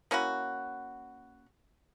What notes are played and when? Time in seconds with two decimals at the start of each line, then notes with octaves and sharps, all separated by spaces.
0.11 A#3 C#4 E4 F#4